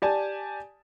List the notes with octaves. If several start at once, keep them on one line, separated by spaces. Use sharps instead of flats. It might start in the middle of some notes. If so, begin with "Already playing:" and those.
G4 D5 G#5 A5